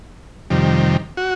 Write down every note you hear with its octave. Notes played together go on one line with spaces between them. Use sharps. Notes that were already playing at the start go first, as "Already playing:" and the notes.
F2 C3 D#3 G3
F#4